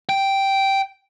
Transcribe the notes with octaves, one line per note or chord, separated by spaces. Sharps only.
G5